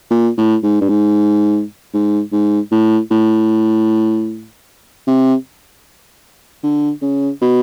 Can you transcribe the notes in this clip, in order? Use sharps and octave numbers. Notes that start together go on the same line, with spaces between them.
A#2
A2
G#2
G2
G#2
G#2
G#2
A2
A2
C3
D3
C#3
B2